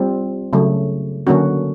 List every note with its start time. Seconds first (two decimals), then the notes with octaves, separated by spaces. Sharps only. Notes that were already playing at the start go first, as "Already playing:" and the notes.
Already playing: G3 C4 F4
0.53 C#3 F#3 A3
1.27 D3 F#3 A#3 C#4 F#4